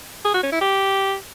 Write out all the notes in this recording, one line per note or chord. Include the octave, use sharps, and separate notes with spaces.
G#4
F#4
C#4
E4
G4